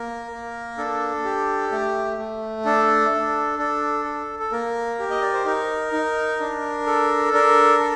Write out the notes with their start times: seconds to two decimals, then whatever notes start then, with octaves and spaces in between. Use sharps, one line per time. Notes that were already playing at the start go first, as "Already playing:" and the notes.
Already playing: A#3 A#4
0.31 A#3
0.78 D4 A4
1.25 G4
1.72 A3
2.18 A3
2.65 D4 A4
3.11 D4
3.58 D4 A4
4.05 A4
4.39 A4
4.52 A#3 A#4
4.99 G4
5.10 D#5
5.21 D5
5.34 C5
5.45 D#4 A#4
5.93 D#4
6.40 D4
6.86 A4
7.33 D4 A#4
7.80 A4